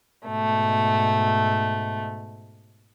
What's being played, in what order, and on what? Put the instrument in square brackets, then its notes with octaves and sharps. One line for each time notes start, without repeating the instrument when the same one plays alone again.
[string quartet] G#2 B2 A3